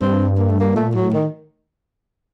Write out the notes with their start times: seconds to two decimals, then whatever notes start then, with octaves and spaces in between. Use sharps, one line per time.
0.01 G2 C4
0.38 A#3
0.49 A3
0.60 A#3
0.76 A#2 A3
0.94 A2 F#3
1.13 D#3